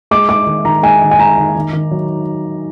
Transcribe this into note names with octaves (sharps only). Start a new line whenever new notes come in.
G#3 D6
G#3 D6
D#3
D#3 A#5
G#3 G#5
D#3
G#5
G#3 A#5
D#3
D#3
D#3
F#3